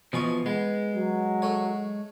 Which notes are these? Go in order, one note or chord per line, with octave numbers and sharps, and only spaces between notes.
B2 E3 F3 D#5 C#6
G#3 B3
F#3
A3 C#5